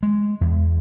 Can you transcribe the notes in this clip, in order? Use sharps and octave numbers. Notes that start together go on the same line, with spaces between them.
G#3
E2